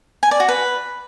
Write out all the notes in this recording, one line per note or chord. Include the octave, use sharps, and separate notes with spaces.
G#5
D5
F#4
B4